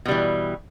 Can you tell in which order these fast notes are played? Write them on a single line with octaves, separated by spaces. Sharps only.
B2 G3 E3